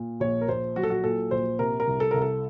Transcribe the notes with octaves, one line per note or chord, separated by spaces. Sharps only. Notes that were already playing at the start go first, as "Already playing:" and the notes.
Already playing: A#2
A#1 C#5
A#4
A#1 C5
F#3 F#4
A4
F#4
A#2 A4
A#1 C5
C3 A#4
A#4
C2
A4
C2 A#4
A4